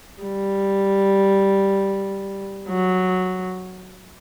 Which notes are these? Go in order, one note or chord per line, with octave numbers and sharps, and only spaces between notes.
G3
F#3